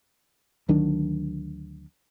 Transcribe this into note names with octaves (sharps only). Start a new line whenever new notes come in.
D2 D#3 F#3 D4